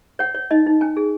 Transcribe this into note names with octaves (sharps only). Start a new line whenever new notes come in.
C#5 F#5
C#5
D#4 D#5
D#4
C#4 G#5
G#4